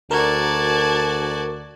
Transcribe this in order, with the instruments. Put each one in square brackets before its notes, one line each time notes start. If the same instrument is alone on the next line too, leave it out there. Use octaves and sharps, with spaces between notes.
[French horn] D2 [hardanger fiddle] F#4 D5 [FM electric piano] A#4 [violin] A5 G#6